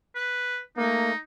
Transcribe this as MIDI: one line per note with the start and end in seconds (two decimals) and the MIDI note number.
0.15 0.59 71
0.77 1.11 57
0.77 1.11 58
0.77 1.17 63